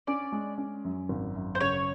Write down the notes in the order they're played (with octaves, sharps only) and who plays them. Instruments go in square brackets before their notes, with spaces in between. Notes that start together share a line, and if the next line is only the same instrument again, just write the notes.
[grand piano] C#4 [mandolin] D5
[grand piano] G#3
C#4
F#2
G#1
F#2
[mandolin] C5
[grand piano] C#3 [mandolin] C#5